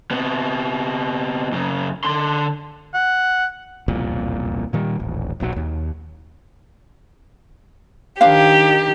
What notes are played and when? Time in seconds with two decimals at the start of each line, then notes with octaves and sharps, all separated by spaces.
0.11 C3 B3
1.52 F#2 C#3
2.04 D3 C6
2.94 F#5
3.88 E1 C2 F2 A#2
4.73 A#2 D#3 G3
4.99 D#1 A1
5.40 D#1 B1 A2 F#3
5.56 D#2
8.21 D#3 D4 G4 C5 F5